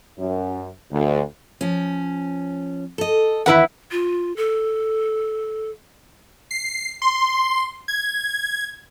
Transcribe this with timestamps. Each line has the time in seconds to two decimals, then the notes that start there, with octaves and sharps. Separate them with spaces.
0.18 F#2
0.91 D2
1.61 F3 C#4
2.98 A4 D#5
3.46 E2 D#3 E3 E4 B4 F#5
3.91 F4
4.37 A4
6.51 C7
7.02 C6
7.88 G#6